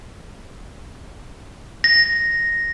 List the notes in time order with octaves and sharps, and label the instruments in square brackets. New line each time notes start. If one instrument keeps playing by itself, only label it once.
[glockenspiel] A#6